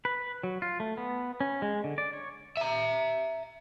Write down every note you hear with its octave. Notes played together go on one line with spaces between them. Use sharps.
B4
F#3
F4
A3
B3
C#4
G#3
D3
D5
C#5
E5 A#5